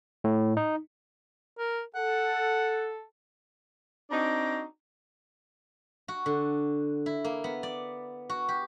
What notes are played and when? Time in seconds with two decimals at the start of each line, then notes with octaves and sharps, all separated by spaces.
0.24 A2
0.57 D#4
1.58 A#4
1.95 A4 F#5
4.11 C4 D4 D#4 F#4 A#5
6.08 F#4
6.26 D3
7.06 E4
7.24 A#3
7.44 B3
7.63 D5
8.30 F#4
8.49 G4